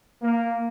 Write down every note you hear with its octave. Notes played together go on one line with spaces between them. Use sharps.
A#3